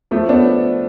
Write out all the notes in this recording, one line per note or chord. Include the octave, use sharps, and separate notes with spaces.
F3 A3
B3 D4